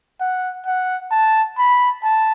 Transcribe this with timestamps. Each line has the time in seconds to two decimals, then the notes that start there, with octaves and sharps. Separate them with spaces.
0.21 F#5
0.66 F#5
1.12 A5
1.58 B5
2.03 A5